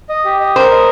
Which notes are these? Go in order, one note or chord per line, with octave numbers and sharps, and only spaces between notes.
D#5
G4
D#5
A#4 C5
D#5